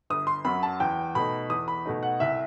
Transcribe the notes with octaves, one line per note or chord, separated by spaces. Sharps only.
G1 D#6
C6
F#2 F#3 B5
A5
E2 G5
B2 A3 D#4 B5
E2 D#6
B5
B2 A3 D#4
F#5
C2 E5